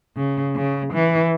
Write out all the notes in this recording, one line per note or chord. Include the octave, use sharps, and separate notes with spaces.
C#3
C#3
E3